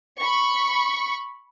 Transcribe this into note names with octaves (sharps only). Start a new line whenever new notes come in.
B5 C#6